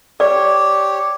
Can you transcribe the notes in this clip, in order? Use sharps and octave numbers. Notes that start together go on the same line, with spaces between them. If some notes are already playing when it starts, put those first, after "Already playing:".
G4 C#5 D5